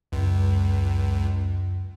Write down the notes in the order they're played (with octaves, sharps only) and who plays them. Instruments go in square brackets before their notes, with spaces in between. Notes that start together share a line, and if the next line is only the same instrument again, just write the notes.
[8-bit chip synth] C#2 [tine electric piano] F#2